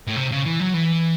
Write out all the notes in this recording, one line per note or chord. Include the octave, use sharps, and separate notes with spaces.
A2
C3
C#3
E3
F#3
E3